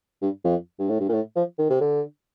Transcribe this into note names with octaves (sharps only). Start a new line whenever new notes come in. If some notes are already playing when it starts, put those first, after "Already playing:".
G2
F2
G2
A2
G2
A#2
A2
F3
D#3
C3
D3